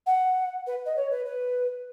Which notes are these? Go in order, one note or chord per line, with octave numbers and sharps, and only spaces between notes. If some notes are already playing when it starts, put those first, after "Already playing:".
F#5
B4
D#5
C#5
B4
B4